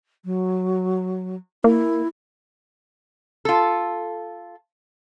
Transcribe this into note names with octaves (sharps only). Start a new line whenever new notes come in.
F#3
A#3 E4
F4 A4